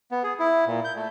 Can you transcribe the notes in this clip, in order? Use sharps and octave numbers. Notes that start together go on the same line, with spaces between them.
B3
G#4
E4
A#2
G6
A3